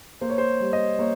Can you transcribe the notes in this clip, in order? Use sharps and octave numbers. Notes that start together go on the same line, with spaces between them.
A#3 C5
C#5
C5
G3
D#5
A#3 C#5